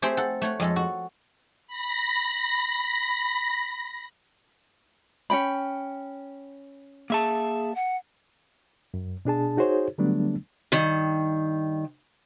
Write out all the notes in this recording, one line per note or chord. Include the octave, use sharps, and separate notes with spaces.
A3 C4 G4 G#4 C5
A4 F#5
A3 C#5 F#5
F2 G#3 A4
F#4
B5 A#6
C#4 G5 B5
A#3 G#4 E5 A5
F#5
F#2
B2 D4 G#4 A5
D#4 F#4 G#4 C5 C#5
D3 F#3 G3 A3 B3 D4
G2 D#3